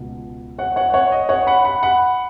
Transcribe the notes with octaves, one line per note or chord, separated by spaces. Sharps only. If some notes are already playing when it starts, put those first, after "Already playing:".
Already playing: C#2 B2
C#5 F#5
C#5 F#5
C#5 F#5
D#5
C#5 F#5
F#5 B5
F#5 B5
F#5 B5